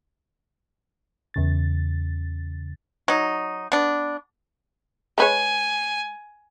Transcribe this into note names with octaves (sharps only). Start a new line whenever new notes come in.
E2 C#3 A6
F#3 D#4
B3 D4
G#3 B4 C#5 G#5